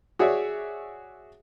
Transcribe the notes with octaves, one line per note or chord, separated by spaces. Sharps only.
F#4 G#4 C#5 D5 E5